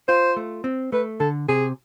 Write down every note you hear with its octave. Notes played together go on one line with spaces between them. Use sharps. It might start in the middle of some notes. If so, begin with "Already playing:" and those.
F4 C5
A3
C4
A3 B4
D3 A4
C3 G#4